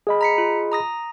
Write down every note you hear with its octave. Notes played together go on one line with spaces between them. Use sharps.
G#4 D#5 B5
A#5 B6 C#7
F4
A#5 D#6 A#6